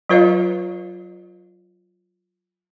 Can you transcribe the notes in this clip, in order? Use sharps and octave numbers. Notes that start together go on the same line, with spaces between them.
F#3 F4 B4 C#5 D#5 F5